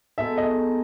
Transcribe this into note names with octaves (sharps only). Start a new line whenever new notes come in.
B2 G#3 D#4 A4 E5
D#5